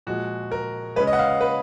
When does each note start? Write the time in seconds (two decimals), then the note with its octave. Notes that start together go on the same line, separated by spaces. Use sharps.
0.07 A#2 F3 G#3 F#4
0.52 A#4
0.96 G#3 B4
1.00 C#3
1.07 D#5
1.13 F#5
1.19 F5
1.29 F5
1.41 B4